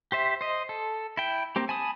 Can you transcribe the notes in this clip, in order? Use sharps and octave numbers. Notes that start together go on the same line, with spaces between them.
G4 C5 E5
C5 D#5
A4
E4 G5
A#3 C4 G4
G#5 A5 B5 D#6